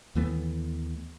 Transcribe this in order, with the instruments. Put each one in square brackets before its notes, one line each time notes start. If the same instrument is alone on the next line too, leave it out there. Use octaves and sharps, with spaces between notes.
[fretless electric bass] D#2 E3 A3 B3